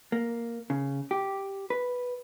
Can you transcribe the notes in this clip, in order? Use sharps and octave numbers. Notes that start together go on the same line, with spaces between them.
A#3
C#3
G4
B4